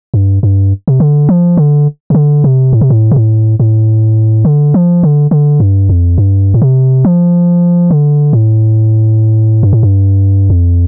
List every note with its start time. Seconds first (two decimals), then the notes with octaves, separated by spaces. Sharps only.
0.14 G2
0.43 G2
0.88 C3
1.00 D3
1.29 F3
1.57 D3
2.10 C3
2.15 D3
2.44 C3
2.73 A2
2.81 C3
2.90 A2
3.11 C3
3.16 A2
3.60 A2
4.45 D3
4.74 F3
5.03 D3
5.31 D3
5.60 G2
5.89 F2
6.18 G2
6.54 A2
6.62 C3
7.05 F3
7.91 D3
8.33 A2
9.63 G2
9.73 A2
9.83 G2
10.50 F2